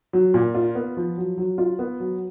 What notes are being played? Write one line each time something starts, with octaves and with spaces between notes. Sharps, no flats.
F#3
A#2
F4
B3
F3
F#3
F#3
F4
B3
F#3